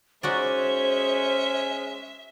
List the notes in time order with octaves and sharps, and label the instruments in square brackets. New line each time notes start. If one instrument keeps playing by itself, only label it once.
[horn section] G#3 C#4 [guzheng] D#4 F#4 D5 [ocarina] C5 [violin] E5